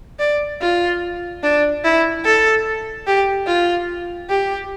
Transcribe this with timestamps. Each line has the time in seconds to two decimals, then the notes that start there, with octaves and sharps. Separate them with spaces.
0.19 D5
0.61 F4
1.43 D4
1.84 E4
2.24 A4
3.07 G4
3.47 F4
4.29 G4